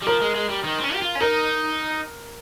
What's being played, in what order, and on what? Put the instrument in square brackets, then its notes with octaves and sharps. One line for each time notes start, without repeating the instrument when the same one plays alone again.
[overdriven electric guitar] G3
[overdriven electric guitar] F3 [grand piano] A#4
[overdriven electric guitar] G#3
G#3
G3
D#3
C4
C#4
G4
F4
C#4
[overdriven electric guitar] D#4 [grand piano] A#4